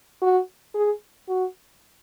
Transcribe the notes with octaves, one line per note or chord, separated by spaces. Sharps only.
F#4
G#4
F#4